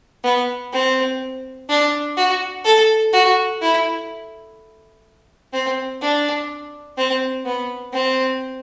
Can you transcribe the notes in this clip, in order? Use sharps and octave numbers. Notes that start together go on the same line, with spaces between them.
B3
C4
D4
F#4
A4
F#4
E4
C4
D4
C4
B3
C4